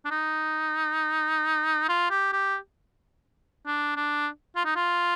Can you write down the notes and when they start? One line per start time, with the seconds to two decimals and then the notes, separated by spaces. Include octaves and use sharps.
0.05 D4
0.11 D#4
1.89 F4
2.10 G4
2.33 G4
3.66 D4
3.96 D4
4.56 F4
4.65 D#4
4.75 F4